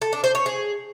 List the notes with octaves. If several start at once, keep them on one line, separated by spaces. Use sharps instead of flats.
A4
D4
C5
C#5
G#4